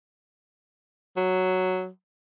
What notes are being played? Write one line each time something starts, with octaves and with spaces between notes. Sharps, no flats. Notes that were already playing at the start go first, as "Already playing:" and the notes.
F#3